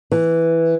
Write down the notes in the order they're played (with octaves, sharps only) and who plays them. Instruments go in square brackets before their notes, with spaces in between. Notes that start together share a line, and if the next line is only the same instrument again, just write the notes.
[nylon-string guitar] E3